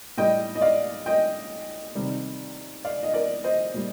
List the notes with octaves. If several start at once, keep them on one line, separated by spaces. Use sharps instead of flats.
A2 G3 D#5 G5
D#5
D5 F5
D#5 G5
C3 D#3 G3
D5 F5
D#5
A#4 D5
C5 D#5
A#2 G3